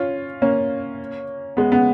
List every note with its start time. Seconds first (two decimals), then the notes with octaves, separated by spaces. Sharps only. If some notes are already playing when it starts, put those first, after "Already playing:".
Already playing: C#4 F4
0.42 A#3 C#4
1.57 G#3 B3
1.72 G#3 B3